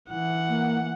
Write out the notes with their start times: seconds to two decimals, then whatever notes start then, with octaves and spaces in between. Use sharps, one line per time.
0.10 E3 F#5
0.49 A#3